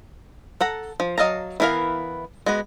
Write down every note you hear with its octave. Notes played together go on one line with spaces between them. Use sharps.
A4 F#5 A#5
F3
F#3 D#5 F5 A5 A#5
E3 B3 E4 A#4 F5
G#3 B3 F#4 B4